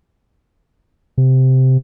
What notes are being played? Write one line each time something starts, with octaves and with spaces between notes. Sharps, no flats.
C3